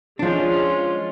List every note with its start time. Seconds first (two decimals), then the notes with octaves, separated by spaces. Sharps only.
0.19 F3 G#3 C#4 D4 F4